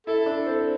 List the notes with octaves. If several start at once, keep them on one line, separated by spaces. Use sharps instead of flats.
E4 A4
D4
C4